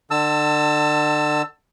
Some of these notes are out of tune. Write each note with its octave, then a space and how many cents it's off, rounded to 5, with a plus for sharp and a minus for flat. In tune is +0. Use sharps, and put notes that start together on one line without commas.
D3 +35 A5 +25 E6 +0